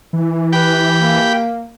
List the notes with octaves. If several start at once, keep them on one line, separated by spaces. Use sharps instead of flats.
E3
G4 B4 G5 B5
A#3